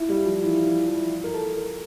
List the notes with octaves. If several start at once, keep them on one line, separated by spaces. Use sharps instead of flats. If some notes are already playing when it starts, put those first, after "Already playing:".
Already playing: E4 F4
G3
F3
E3
E3
F3
A#4
A4
A#4